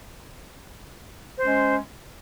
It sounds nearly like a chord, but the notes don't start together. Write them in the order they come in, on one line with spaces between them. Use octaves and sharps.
C5 C#4 G#3